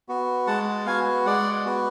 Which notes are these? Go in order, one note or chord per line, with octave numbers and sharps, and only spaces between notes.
B3 F#4
G#3 F#5 A5
B3 F#4 F5 G#5
G#3 D5 F#5
B3 F#4